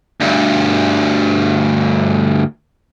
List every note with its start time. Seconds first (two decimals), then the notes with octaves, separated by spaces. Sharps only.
0.21 D2 G2